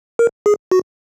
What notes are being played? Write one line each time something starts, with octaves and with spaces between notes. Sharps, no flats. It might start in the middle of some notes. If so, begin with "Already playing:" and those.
A#4
G#4
F#4